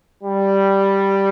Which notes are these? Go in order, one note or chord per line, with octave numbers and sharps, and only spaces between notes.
G3